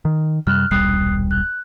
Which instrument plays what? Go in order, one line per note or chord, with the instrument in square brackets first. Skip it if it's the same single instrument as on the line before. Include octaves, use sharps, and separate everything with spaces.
[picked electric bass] D#3
[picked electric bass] F#2 C3 G3 [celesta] F6 F#6
[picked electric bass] D#1 B1 G3 [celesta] D#6 F#6 C7
[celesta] F#6